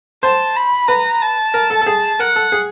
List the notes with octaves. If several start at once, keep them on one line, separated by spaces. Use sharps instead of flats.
C5 A5
B5
B4 A#5
A5
A#4
A4
A4
G#4
A#4 F#5
A4
G#4